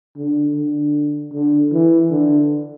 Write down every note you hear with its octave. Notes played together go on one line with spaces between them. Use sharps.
D3
D3
D3
E3
D3